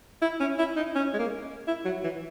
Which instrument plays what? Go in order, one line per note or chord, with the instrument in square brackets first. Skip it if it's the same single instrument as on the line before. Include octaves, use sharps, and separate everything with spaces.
[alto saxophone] E4
C#4
E4
D#4
C#4
G#3
A#3
E4
F#3
E3